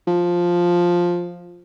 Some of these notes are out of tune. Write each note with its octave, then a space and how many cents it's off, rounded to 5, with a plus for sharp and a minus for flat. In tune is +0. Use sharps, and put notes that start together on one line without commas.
F3 +5